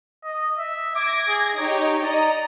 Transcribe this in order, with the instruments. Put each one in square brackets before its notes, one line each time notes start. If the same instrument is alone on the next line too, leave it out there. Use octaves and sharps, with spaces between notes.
[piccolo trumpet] D#5
E5
[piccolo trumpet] D6 [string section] G#6 A#6
[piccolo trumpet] G#4
[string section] D#4 G4 [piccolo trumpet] C#5
[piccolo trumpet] D5 [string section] D#5 A#5